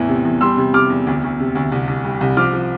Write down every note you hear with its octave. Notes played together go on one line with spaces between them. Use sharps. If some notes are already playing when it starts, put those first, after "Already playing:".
Already playing: E2 A2 E3
C3
E2
G3 C6 E6
C3
C3 D6 F6
E2
D2
D2
C3
D2
C2
C2
G3
C2
F3 D6 F6
F3